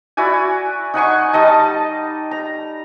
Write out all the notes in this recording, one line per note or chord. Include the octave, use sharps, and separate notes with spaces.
E4 F#4 D5 G#5
D#4 F#5 G#5 C#6
G3 D#4 D#5 A5
A5
A#5